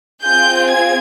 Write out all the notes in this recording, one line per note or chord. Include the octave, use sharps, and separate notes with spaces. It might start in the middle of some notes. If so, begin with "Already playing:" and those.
C4 F4 G#4 G6
G#6